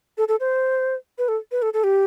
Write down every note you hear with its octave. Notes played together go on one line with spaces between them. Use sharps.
A4
A4
C5
B4
A4
B4
A4
A4
G4